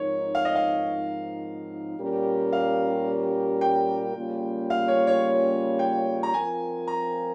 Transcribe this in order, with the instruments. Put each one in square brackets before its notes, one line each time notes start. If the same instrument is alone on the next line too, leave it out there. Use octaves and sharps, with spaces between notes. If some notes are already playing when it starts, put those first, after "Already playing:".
Already playing: [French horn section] G#2 F3 C4 D#4 A#4 [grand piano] C#5
[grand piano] F5
D#5
F5
[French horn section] A#2 G3 C#4 G4 A#4
[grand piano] F5
G5
[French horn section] C#3 G3 A#3 C#4 F4
[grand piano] F5
C#5
C#5
G5
A#5
[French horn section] F3 C4 F4 A#4 [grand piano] G#5
[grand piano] A#5